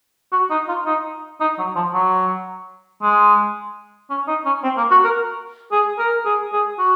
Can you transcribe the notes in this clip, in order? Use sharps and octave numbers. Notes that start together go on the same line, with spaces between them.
F#4
D#4
F4
D#4
D#4
F#3
F3
F#3
G#3
C#4
D#4
C#4
C4
A#3
F#4
A#4
G#4
A#4
G#4
G#4
F#4